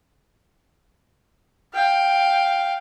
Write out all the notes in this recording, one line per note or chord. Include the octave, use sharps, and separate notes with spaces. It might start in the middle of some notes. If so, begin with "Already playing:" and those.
F5 G5